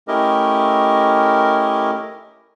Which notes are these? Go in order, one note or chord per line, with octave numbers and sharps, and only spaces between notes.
A3 C#4 E4 G4 A#4 D#5